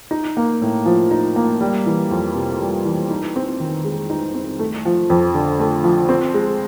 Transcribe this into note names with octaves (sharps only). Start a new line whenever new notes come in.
D#4
A#3
A2
F3
D#4
A#3
G3
E3
F2
C3
G3
E3
D#4
C4
D#3
G#3
D#4
C4
A3
F3
F2
D3
A3
F3
C4
G#3